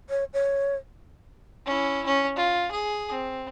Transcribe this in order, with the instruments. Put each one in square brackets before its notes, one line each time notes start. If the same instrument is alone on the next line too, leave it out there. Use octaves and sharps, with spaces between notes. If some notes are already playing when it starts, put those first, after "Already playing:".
[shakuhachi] C#5
C#5
[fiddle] C#4 E4
C#4
F4
G#4
C4